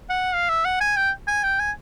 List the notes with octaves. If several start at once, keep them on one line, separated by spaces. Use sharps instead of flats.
F#5
F5
E5
F#5
G#5
G5
G#5
G5
G#5